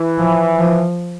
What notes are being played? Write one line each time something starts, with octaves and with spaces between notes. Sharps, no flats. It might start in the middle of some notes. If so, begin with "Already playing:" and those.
Already playing: E3
F3
F3